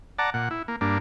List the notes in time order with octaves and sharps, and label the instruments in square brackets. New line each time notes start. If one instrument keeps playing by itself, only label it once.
[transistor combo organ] D5 F#5 A5 A#5
A#2 F#5
E4
A#3
G2 A#3 D4